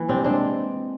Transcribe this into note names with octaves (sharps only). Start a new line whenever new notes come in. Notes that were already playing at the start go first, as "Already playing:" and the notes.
Already playing: E3 A#3
C3 C4 D4
G#3 C4 D4